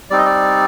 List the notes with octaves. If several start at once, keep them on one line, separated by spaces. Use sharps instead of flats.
G3 C4 D#4 D5
D#5
D5